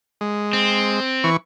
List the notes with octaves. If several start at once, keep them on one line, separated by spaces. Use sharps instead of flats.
G#3
C4
E3 C#6